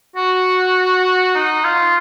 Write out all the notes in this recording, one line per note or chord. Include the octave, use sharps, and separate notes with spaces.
F#4
D#4
F4